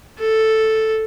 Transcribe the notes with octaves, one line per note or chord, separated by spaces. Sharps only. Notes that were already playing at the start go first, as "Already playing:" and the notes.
A4